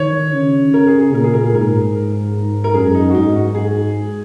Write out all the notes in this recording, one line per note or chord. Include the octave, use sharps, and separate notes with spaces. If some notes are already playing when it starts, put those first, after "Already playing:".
Already playing: D#3 C#5
C#3
A#4
G#4
G#4
A#2 A#4
G#4
A#4
G#4
G#2 A#4
A#4
F#2 G#4
D#4
F#4
G#2 D#4
F#4
G#4